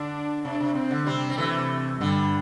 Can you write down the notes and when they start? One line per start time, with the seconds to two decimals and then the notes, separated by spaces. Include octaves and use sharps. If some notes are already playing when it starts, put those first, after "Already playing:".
Already playing: D3 D4
0.44 C3 D4
0.60 C3
0.75 C3 C4
0.91 D3
1.07 C3 G3 C4
1.30 C4
1.38 C3 E3 A3
2.00 G2 D3 G3